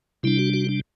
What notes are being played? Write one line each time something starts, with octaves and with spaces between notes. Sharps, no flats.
C3 G3 D4 E4
F#4
F#4
D4